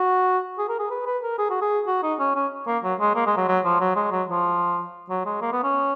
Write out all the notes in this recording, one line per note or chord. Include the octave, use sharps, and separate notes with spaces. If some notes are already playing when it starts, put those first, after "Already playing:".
Already playing: F#4
G#4
A#4
G#4
B4
B4
A#4
G#4
F#4
G#4
F#4
D#4
C#4
C#4
A#3
F#3
G#3
A#3
G#3
F#3
F#3
F3
F#3
G#3
F#3
F3
F#3
G#3
A#3
B3
C#4